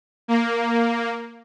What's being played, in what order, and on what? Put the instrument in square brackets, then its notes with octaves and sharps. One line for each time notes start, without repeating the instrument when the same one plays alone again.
[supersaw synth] A#3